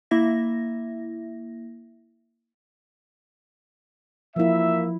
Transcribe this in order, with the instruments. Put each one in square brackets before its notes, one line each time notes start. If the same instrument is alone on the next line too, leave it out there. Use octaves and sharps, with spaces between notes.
[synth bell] A#3 E4 E5 A#6
[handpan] F3 E4 [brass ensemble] A#3 E5